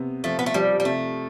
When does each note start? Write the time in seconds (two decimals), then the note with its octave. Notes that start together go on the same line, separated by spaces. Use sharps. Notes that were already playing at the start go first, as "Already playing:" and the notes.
Already playing: C3 B3
0.24 F3 A3
0.39 B3
0.46 A3
0.54 F3 G3
0.80 G3
0.85 C3 A3